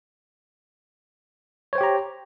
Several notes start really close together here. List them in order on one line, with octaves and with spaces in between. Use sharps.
C#5 C5 G5 G4 A#5